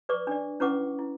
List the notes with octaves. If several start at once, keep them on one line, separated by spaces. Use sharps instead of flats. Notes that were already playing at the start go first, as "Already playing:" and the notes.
B4 D5 C#6 D6
D4 D5
C#4 E4 B4 F#5 C#6 D6
E4